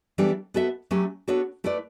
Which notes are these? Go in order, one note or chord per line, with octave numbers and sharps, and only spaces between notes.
E3 G3 B3 D4 A4
B3 F#4 A4 E5
F#3 A3 C#4 G4
B3 D4 F#4 A4 C#5
A3 E4 B4 D5